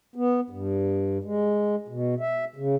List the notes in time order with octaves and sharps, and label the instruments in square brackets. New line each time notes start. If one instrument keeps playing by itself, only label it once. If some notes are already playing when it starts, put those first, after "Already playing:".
[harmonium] B3
G2
G#3
B2
E5
C#3